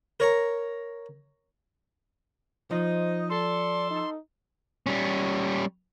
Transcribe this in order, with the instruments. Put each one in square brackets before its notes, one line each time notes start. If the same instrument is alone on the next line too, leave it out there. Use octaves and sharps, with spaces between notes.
[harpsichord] A#4 C#5 A#5
[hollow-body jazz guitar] F3 [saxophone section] D#4 D#5 [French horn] C5
[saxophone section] A4 [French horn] D5 [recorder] C6
[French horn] D#4
[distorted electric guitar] G3 C#4